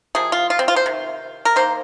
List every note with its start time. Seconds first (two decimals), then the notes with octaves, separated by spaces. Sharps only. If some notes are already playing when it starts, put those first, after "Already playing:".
0.15 C3 F3 A#3 G#4
0.32 F4
0.50 F4
0.59 C4
0.68 F4
0.76 C5
0.86 C3 D#3
1.45 A#4
1.56 D#3 A#3 C5